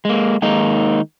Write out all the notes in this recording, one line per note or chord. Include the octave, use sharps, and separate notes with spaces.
G#3 A#3
D#3 G#3 A#3 D#4